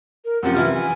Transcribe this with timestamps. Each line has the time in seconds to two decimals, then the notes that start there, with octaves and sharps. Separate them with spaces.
0.25 A#4
0.43 F#2 C3 F3 F#5
0.55 E3 E4 F4 F6
0.75 G#5